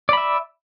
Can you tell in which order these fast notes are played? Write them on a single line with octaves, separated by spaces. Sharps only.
D5 B5 E5